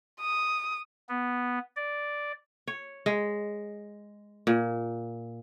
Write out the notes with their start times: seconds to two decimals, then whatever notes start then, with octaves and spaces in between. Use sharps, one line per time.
0.20 D#6
1.09 B3
1.76 D5
2.67 C#5
3.06 G#3
4.47 A#2